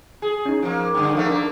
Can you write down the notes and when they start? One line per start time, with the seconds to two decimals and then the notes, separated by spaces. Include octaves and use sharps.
0.22 G#4
0.45 C#4 D#4
0.62 F3 A#3
0.94 G2 D3
1.15 F3 A3 A#3 D#4 F5
1.29 A#3 D4